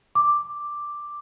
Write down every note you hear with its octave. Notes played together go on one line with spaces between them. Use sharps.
D6